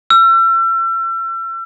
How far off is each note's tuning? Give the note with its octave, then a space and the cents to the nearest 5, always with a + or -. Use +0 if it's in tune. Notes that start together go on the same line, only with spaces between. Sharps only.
E6 +40